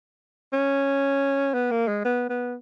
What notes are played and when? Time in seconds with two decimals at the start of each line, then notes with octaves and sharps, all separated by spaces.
0.53 C#4
1.54 B3
1.71 A#3
1.88 G#3
2.05 B3
2.29 B3